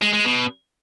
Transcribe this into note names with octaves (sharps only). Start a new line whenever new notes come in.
G#3
G#3
B2